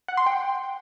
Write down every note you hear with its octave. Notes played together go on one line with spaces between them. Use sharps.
F#5
C6
G5